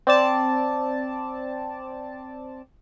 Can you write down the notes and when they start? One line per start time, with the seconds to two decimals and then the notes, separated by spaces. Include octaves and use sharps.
0.07 C4 D5 A5